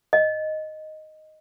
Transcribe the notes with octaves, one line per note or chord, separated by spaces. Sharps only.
D#5